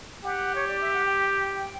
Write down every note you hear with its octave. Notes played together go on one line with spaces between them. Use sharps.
G4 F#5
C#5
D5
E5
F#5
G5